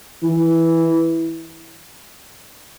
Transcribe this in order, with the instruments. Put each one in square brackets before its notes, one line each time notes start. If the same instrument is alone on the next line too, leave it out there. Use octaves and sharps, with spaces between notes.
[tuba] E3